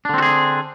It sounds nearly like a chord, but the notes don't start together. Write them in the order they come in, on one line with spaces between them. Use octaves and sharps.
D4 D3 C4 F#4 G#4